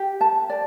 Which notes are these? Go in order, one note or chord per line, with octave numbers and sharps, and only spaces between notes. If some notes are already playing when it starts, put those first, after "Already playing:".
Already playing: G4
A5
D5